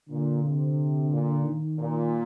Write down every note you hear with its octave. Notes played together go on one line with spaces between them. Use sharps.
A#2 D3
C3
A#2
D#3
A#2